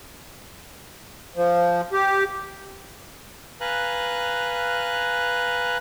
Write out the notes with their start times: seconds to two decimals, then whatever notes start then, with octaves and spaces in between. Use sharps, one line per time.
1.36 F3
1.93 G4
3.61 B4 F5 G#5 A#5 F#6